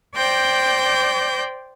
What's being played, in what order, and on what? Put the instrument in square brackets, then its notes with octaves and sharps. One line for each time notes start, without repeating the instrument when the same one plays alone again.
[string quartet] C5 D5 G5 G6 A#6